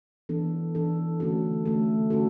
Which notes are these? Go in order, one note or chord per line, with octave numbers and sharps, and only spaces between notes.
E3 B3 D4 A4
E3 B3 D4 A4
D3 A3 C#4 F#4 A4
D3 A3 C#4 F#4 A4
D3 A3 C#4 F#4 A4